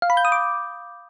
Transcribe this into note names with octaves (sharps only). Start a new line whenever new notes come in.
F5
B5
G6
D#6
D6